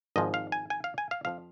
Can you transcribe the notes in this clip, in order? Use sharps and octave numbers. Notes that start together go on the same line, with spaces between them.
G#1 G#2 F3 G#3 D#5
F5
G#5
G#5
F5
G#5
F5
F2 F3 C4 F5